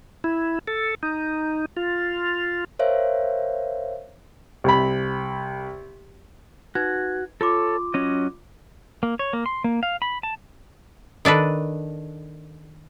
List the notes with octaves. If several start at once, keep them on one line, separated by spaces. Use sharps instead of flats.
E4
A4
D#4
F4
A#4 C5 C#5 E5 F5
C2 B5
D#4 F#4 B4 G#6
F4 A4 C#5 C6 D6
F#3 C#4 D#5
A#3
C#5
A#3
C6
A#3
F5
B5
A5
D#3 D4 A4 B4